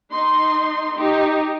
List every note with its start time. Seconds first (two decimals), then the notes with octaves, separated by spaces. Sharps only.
0.10 D#4 C6
0.97 D#4 G4